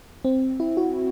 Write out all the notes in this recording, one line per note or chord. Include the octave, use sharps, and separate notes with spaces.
C4
E4
F#4